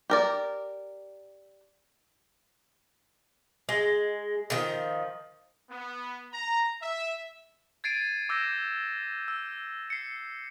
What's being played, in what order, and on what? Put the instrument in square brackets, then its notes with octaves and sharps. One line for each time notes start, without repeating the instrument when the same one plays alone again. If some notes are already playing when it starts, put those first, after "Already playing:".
[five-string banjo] G4 A#4 D5
[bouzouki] G#3
D3 D#3 F3
[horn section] B3
A#5
E5
[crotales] G#6 A6 C7 D7 D#7
D6 E6 G6 A#6 D7 E7
E6
C7 C#7